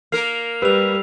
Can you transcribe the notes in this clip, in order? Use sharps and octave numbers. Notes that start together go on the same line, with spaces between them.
A#3 A#4 F6 C7 F7
G3 B4 E6 F7